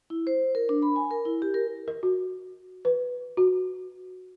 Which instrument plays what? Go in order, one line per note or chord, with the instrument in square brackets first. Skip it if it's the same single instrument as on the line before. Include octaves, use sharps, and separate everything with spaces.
[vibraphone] E4
C5
A#4
D4
B5
G#5
A#4
E4
G4
A#4
[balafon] A#4
F#4
B4
F#4